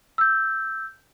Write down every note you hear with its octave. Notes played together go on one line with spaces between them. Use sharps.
E6 G6